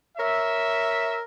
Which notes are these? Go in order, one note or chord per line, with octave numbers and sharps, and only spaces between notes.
A#4 C#5 E5